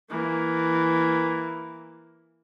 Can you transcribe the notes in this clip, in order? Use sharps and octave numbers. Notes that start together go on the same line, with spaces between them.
E3 A#3